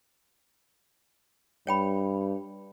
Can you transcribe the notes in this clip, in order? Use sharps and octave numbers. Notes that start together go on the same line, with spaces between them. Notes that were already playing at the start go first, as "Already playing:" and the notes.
G2 C#5 G5 B5